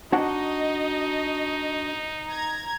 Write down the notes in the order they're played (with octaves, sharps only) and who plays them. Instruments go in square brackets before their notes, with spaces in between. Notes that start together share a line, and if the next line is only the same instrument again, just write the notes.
[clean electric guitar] D4 F#4 F#5 [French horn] D#4 [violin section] D#5
[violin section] A#5 G#6